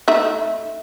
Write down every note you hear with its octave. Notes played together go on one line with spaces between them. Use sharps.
A3 D#4 E5